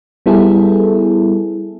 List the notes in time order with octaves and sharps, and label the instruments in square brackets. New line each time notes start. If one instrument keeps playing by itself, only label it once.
[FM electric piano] G3 B3 E4 G#4 A4